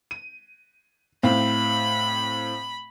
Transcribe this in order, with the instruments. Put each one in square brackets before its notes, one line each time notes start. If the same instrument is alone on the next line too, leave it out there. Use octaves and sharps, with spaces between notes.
[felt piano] D#7
[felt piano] A2 C4 F5 [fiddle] B5